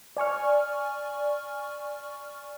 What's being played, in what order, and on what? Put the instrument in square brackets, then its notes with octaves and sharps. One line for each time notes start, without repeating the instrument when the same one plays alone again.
[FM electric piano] D5 G#5 C#6 F6